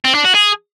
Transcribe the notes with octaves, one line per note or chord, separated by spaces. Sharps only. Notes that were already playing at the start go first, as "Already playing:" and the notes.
C4
D4
F#4
G#4